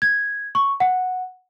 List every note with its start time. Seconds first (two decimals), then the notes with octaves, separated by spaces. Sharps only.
0.02 G#6
0.55 C#6
0.80 F#5